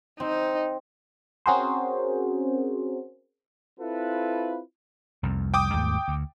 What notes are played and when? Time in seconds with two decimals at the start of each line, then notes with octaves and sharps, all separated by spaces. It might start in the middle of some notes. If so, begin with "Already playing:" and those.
0.20 C4 D#4
1.46 C4 C#4 F#4 G#4 A#4 C5
3.80 C4 E4 F4 A4 B4
5.23 C2 F2
5.54 G5 D6 D#6
5.73 D#2 G#2 A3
6.08 D2